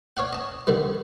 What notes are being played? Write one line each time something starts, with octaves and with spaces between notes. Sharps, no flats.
C#5 D5 F5 F#5
D#5 A5
D3 D#3 G3